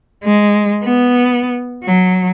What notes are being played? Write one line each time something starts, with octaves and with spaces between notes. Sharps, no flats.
G#3
B3
F#3